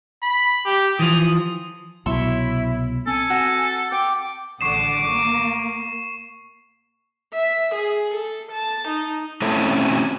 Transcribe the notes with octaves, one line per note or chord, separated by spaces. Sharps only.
B5
G4
E3 F3 D#6
C2 B2 F#3 E4 C#5 E5 C6
C4 A4 G#5
F#4
G5 D6
A1 D3 F#5 C#6 D6 C7 E7
A#3 C#6
E5
G#4
A4
A5
D#4
A3 C4 C#4 E4 A4